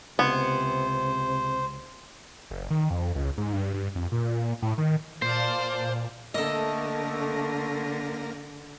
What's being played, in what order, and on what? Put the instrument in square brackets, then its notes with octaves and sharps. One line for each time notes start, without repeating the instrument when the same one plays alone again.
[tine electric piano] C#2 G#6 [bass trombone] C3 [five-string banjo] B3 [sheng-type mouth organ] C5
[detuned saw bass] F#1
D#3
F2
C#2
G#2
G2
G2
F2
A#2
A2
D#3
[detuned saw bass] A#2 [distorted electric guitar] C5 [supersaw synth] D5 F5 A5
[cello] D3 [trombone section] A3 [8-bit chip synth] A#3 A#4 A#6 [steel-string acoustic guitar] A4 D#5